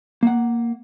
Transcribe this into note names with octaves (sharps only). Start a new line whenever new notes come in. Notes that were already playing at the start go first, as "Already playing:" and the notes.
A#3 F#5